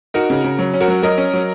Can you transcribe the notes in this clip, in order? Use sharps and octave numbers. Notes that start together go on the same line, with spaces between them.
D#4 F#4 A#4
C#3
C#3
F#3
C#4
F#4 A#4
F#3
F#3 A#4 D#5
C#4
F#3